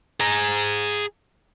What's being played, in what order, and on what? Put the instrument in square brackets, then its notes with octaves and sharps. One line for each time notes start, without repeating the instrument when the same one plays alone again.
[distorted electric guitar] G#4 A#5